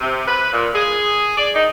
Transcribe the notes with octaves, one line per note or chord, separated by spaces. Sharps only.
C3
B4
A#2
G#4
D5
D#4